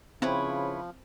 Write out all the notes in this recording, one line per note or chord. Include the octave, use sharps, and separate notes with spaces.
C#3 F3 C4 E4 B4 C#5